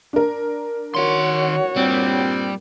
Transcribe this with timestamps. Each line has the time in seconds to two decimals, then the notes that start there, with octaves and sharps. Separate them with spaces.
0.13 D4 A#4
0.95 D#3 F#4 C#5 C6
1.76 G2 A#2 G3 C4